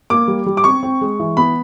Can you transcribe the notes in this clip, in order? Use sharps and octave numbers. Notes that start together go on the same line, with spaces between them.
A#3 D6
G3
G3
D6
C4 C#6
C4
G#3
E3
B3 B5